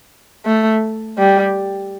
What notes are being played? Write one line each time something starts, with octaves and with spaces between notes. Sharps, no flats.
A3
G3